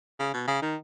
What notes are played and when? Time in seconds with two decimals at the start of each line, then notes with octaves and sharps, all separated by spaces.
0.19 C#3
0.33 B2
0.47 C#3
0.62 D#3